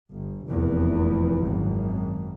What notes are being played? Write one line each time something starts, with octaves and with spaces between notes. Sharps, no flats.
G1
F1 E2 A#2
G#1 F#2